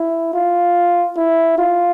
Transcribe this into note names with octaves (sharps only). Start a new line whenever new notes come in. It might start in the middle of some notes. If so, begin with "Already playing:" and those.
Already playing: E4
F4
E4
F4